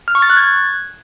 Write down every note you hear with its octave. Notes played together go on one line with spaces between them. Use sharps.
F6
C#6
A6
F#6
G#6